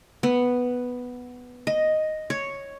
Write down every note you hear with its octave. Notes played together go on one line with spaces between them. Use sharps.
B3
D#5
C#5